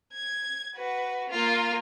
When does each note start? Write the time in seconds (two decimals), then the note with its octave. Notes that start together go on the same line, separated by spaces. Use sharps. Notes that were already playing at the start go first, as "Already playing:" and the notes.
0.14 G#6
0.76 F#4 B4
1.30 A#3 F4